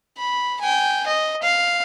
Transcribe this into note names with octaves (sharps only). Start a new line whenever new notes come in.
B5
G5 G#5
D#5
F5